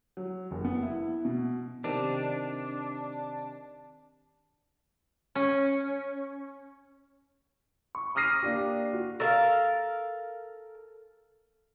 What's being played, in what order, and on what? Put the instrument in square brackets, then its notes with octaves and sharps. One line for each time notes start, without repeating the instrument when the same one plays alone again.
[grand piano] F#3
F#1
B3
E4
B2
[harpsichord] C3 D#3 [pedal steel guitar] D4
[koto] C#4
[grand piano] C#6
D6 D#6 F6 A#6 C7 D#7
A#3 D4 G4
F#4
[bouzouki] A4 A#4 F5